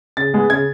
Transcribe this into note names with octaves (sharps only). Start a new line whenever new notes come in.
C#3 A6
G#3 B3
C#3 G#6